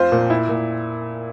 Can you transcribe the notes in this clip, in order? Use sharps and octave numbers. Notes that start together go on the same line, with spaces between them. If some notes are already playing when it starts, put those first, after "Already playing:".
Already playing: F2 F4 C5
A#2
E4
A#2